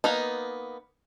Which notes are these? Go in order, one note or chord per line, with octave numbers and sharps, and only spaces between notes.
A#3 B3 D#4